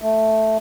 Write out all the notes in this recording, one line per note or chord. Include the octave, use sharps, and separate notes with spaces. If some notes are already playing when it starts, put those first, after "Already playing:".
A3